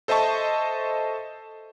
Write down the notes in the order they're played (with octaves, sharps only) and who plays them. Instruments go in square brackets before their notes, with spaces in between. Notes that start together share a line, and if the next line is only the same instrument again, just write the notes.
[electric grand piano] A4 C5 D#5 E5 A5 C#6